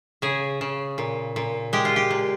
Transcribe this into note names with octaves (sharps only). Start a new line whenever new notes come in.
C#3 G#4
C#3
A#2
A#2
G#3 G4
F4
G4
A#2